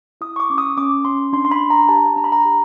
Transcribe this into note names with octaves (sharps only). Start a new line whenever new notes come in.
E4 D#6
C#6
D6
C#4
D#6
C#4 D6
C#4 C6
D4 C6
C6
B5
D4
A#5
G4 A5
D4 A#5
B5
A#5
G4